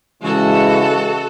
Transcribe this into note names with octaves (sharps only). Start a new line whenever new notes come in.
C#3 E3 G#3 F#4 A4